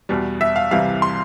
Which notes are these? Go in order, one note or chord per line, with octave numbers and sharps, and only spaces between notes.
E2 B2 G3
E5
F5
C2 C3 E3 G3 F5
C6